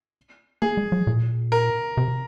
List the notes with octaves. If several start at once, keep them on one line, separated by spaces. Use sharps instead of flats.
A#3 G#4
G#3
F#3
A#2
A#4
C3